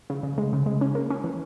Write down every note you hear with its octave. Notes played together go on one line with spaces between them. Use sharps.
C#3
C#3
G#3
C#3
G#3
C#4
A#3
C#4
E3